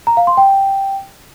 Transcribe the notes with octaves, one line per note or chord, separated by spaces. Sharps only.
A#5
F5
C6
G5